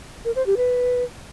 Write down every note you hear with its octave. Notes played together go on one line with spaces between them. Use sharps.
A#4
C5
G4
B4